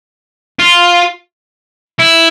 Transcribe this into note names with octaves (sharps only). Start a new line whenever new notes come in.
F4
E4